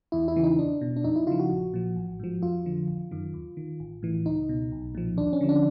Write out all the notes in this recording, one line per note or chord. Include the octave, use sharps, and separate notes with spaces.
E2 E4
E4
C#3 E3
D#4
E2 D4
B2
D4
F2 D#4
E4
C#3 F3 F4
F#4
A#1
A#2 F3
A1
G#2 F3
F2 F4
D3 F3
G#1
F#2 D#3
D#2
D#3
A1
A2 E3
C#2 D#4
B2
B1
A#2 F3
D#2 D4
C#4
D3 F3
D4